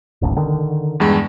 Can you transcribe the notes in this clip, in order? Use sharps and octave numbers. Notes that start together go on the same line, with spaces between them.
E1 A1 D#2
D3 D#3
E2 G2 G#3